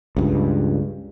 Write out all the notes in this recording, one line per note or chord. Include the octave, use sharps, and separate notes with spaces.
C#2 G2